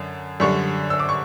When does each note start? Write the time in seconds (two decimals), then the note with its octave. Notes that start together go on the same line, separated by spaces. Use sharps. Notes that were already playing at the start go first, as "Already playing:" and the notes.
Already playing: F#2 D3
0.40 F#2 D3 G3 C#6
0.90 E6
1.00 D6
1.09 C#6